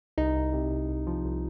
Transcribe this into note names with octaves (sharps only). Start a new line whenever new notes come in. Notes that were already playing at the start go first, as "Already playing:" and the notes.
C2 D#4
C2
C3
C2
C2
F3
C2